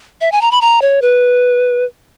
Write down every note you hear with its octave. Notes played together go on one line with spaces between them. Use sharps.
E5
G#5
A#5
B5
A#5
C#5
B4